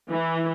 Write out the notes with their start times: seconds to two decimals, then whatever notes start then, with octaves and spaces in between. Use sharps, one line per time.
0.10 E3